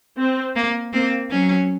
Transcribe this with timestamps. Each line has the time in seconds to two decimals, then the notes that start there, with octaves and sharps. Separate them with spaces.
0.18 C4
0.56 A#3
0.93 A#3 C4
1.31 F#3 C#4